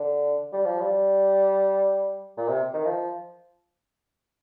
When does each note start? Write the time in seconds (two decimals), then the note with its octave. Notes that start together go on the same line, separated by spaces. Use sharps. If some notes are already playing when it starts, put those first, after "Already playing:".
Already playing: D3
0.53 G3
0.66 F3
0.81 G3
2.37 A#2
2.49 C3
2.74 D#3
2.86 F3